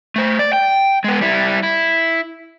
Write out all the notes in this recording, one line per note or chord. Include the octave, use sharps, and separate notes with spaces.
A3 C5
D5
G5
G#3 B3
G3 E4
E4